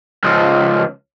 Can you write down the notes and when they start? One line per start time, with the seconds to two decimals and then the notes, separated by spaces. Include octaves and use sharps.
0.24 C#2 F3